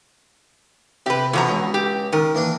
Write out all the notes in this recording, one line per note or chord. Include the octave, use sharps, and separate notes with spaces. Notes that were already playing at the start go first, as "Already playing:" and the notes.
C3 G4 B4
E2 B2 D3 F3 A#5
C#2
G4
D#3 A#4
E3 A#3 D4